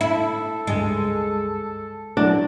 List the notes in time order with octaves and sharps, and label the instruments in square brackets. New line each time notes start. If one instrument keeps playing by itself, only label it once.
[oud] E4 [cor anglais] A4
[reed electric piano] C#2 G2 G#4 [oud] G#3
[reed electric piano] F#3 E4 F#4 [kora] D4